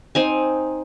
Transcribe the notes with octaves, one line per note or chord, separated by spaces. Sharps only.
C4 D#4 G#5